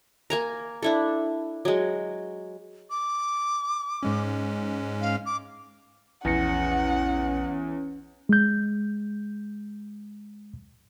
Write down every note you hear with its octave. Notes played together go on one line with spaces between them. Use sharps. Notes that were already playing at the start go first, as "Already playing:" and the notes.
A#3 G#5 A#5
D4 E4 A4
F#3 G#3
D6
G#2 G#3 C#4
F5
D6
A#1 E2 C#4 F#5 A#6 C#7
G#3 G6